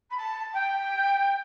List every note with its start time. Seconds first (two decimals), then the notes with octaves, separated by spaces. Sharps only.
0.10 B5
0.17 A5
0.53 G5